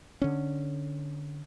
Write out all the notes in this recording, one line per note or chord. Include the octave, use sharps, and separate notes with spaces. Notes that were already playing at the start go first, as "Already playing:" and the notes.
D3 C#4